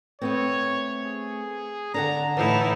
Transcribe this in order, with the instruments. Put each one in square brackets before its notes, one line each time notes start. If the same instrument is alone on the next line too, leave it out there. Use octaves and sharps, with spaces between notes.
[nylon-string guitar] A3 B3 C4 [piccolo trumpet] C#5
[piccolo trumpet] G#4
[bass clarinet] D3 [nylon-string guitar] D4 A4 F#5 [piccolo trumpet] A#5
[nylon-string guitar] A2 E3 [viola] D#4 E4 [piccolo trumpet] A5